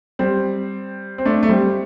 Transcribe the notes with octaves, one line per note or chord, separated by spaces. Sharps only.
G3 C4
C4
A3 D4
A3
G3 C4